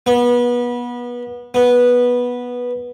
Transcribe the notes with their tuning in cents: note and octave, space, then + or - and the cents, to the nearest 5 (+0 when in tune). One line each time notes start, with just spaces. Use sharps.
B3 -25
B3 -10